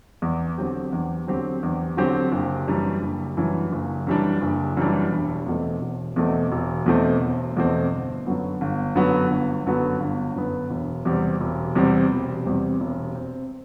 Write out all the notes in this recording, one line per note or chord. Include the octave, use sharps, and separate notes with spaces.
E2
D3 F#3 C4 G4
E2
D3 F#3 C4 G4
E2
D3 F#3 C4 G4
F#1
F#2 E3 G3 D4
F#1
F#2 E3 G3 D4
F#1
F#2 E3 G3 D4
F#1
F#2 E3 G3 D4
E1
E2 B2 A3 C4
E1
E2 B2 A3 C4
E1
E2 B2 A3 C4
E1
E2 B2 A3 C4
G1
F#2 D3 F#3 B3
G1
F#2 D3 F#3 B3
G1
F#2 D3 F#3 B3
G1
F#2 D3 F#3 B3
E1
E2 C3 G3 C4
E1
E2 C3 G3 C4
E1
E2 C3 G3 C4
E1
C4